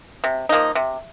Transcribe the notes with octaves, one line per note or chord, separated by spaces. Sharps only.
C3
F3 A#3 D#4
C3